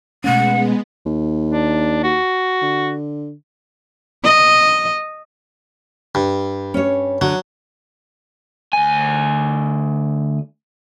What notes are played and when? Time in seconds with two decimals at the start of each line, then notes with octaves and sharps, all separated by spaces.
0.24 B2 G#3 A3 B3 C#4 F#5
1.06 D#2
1.51 D4
2.03 F#4
2.62 D3
4.24 D#5
6.15 G2
6.74 C#4 C#5
7.21 D3 F#3
8.73 D2 G#5